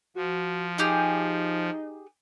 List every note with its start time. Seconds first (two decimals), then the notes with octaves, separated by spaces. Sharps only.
0.16 F3 F#4
0.78 D#4 G4 G#4